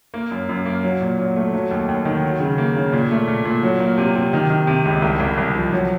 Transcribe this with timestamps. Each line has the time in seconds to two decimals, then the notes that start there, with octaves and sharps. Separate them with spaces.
0.14 A#3
0.31 F#2
0.49 F#2
0.66 A#3
0.83 F#3
1.01 A#2
1.19 F#3
1.36 A3
1.53 F#3
1.71 D#2
1.89 D#2
2.05 D#3
2.23 F#3
2.40 C#3
2.58 A#3
2.76 C#3
2.93 A#2
3.11 A3
3.28 A#2
3.45 A#2
3.63 F#3
3.80 A#3
3.98 C3
4.15 C3
4.33 D#3
4.50 D#3
4.67 C3
4.85 C#2
5.02 C2
5.20 C2
5.38 C2
5.55 F3
5.72 F#3